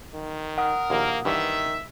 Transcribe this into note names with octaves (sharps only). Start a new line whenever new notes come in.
D#3
A#4 F#5 D#6
A#1 D#2 A#3
G2 D#3 E3 E5